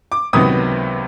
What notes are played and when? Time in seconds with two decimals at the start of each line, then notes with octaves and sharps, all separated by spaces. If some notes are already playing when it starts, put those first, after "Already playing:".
0.12 D6
0.33 C#2 C3 D#3 F#3 B3 D#6